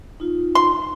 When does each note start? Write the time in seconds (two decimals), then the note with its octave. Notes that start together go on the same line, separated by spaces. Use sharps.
0.20 D#4 F4
0.55 C6